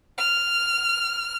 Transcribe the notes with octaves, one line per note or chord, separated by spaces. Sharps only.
F6